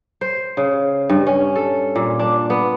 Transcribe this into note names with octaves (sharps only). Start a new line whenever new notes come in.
C5
C#3
G2
C#4
A4
A#2
D4
B3